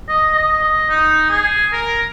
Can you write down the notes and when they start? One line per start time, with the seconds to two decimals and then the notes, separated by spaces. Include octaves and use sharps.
0.09 D#5
0.35 D#5
0.63 D#5
0.90 D#4
1.31 G#4
1.73 A#4